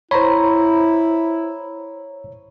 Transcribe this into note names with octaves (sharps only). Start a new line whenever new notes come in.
E4 C5 C#5 A#5 B5